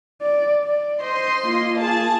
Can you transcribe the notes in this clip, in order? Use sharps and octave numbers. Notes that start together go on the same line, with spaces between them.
D5
D5
C5 D#5 C6
A#3 F4
G#4 A5